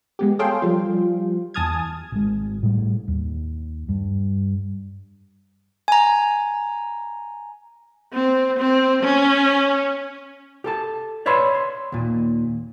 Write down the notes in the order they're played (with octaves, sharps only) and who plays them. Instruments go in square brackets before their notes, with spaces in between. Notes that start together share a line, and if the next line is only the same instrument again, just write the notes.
[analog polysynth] G#3 B3 G4
G#4 A4 C#5 F5 G5 C6
F3 G3 F4
E2 G#5 A5 D#6 F6 G#6
[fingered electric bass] G#1 G#3
A2 G3
D#2
G2
[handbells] G#5 A#5
[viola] C4
C4
C#4
[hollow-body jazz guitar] G4 A4 A5
B4 C#5 D5 E5 B5 C6
C6
D#2 A#2